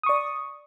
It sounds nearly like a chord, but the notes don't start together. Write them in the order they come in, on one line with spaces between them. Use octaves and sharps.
D#6 C#6 D5